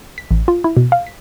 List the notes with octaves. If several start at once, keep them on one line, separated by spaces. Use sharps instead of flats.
B6
A1
F4
E4
B2
F5
B6